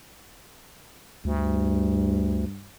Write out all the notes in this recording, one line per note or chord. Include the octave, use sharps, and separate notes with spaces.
D2 G2